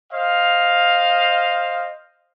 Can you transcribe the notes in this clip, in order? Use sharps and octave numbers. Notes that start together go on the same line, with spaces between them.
C5 D#5 F5